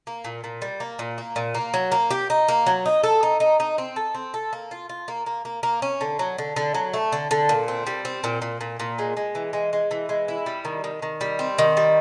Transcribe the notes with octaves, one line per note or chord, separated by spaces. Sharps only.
A#3
A#2
A#2
G3
A#3
A#2
A#3
A#2
A#3
F#3
A#3
G4
D#4
A#3
F#3
D#4
A4
D#4
D#4
D#4
C4
A4
C4
A4
A#3
F4
F4
A#3
A#3
A#3
A#3
C#4
D3
F#3
D3
D3
F#3
A3
D3
D3
A#2
C4
G3
C4
A#2
A#2
A#2
A#2
G#3
G#3
E3
G#3
G#3
E3
G#3
E4
G3
D#3
D#3
D#3
G3
C4
D#3
G3